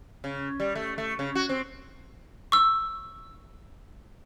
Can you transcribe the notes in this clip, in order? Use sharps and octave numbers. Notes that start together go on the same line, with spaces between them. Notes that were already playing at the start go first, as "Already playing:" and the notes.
C#3
G3
A3
A3
C#3
F#4
C4
C#6 E6